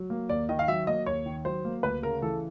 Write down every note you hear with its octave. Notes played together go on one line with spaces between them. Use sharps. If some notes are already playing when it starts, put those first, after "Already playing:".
Already playing: F#3
A#3
D#2 D5
D#3 D#5
F5
F#3 E5
A#3 D#5
D#2 C#5
D#3
F#3 C5
A#3
D2 B4
C#3 A#4
E3 A4